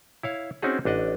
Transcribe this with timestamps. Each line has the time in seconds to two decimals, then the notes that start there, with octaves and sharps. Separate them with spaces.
0.23 E4 C#5 F5
0.62 C4 C#4 D#4 F#4 G#4
0.85 A1 D4 D#5 F#5